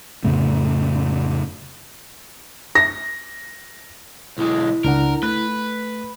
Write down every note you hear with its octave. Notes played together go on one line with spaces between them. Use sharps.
F2 A2 C#3 A3
A#6
B1 G#3 E4
C#2 D4 A#4 F#5
A3 B4 F#6